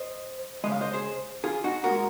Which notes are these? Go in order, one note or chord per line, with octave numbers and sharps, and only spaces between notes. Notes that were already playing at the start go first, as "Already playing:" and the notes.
Already playing: C5 D#5
C#3 G#3 D#5
F5
C5 D#5
G#4 C5
F4 G#4
D#4 F#4
A#2 G#3 F#4 A#4